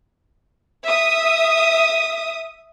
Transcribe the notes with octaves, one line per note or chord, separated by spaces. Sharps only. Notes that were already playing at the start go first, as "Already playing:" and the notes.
E5 D#6